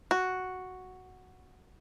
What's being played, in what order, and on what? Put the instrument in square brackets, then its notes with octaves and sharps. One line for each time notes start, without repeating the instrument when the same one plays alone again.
[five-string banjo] F#4